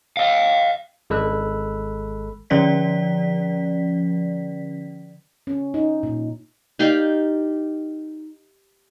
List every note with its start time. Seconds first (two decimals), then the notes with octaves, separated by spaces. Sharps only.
0.17 D#5 F5
1.10 G#1 G#3 A4 B5 E6 F#6
2.50 D3 F3 C#4 D5 B6
5.47 C#4
5.74 D#4
6.03 A#2
6.79 D#4 G4 D5 F5